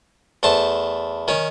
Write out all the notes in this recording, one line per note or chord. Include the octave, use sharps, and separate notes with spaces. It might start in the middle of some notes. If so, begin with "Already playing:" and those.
E2 A3 C5 A5
D#3 C#4